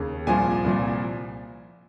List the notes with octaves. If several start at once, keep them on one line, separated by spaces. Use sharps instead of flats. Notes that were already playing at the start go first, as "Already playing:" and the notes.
Already playing: D#2 C#3
C2 A#2 F3 G#5
C2 A#2 F3